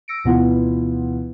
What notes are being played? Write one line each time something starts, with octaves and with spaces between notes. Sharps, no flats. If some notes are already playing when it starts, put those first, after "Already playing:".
E6 A#6 C#7 D7
D2 B2 E3 B3 E4 F4